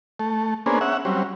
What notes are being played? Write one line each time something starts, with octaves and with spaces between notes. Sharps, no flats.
A3
A#3 B3 C#4 D4 G#4 C5
C#4 E5 F#5
F#3 G3 C4 C#4